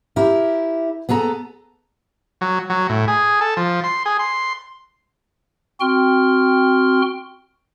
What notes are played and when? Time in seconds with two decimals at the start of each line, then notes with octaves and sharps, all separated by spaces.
0.16 E4 G4 A#4
1.09 B3 G#4 A4 A#5
2.41 F#3
2.70 F#3
2.89 A2
3.08 G#4
3.41 A4
3.57 F3
3.84 C6
4.06 G#4
4.19 C6
5.80 C4 F#4 G5 C6 F6